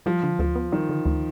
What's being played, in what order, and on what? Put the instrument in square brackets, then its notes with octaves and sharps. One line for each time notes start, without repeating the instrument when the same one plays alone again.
[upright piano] F3 [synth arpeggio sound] G3
[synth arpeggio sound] D3
[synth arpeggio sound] D2 [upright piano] F3
[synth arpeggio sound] B3
[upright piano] D#3 [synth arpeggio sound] G3
[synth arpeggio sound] D3
D2